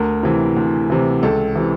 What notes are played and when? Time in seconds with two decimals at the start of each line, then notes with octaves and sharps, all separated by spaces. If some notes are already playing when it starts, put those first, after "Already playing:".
Already playing: D2 A#4
0.23 C3 E3
0.57 D2
0.90 C3 E3
1.23 C#2 A4
1.55 C3 E3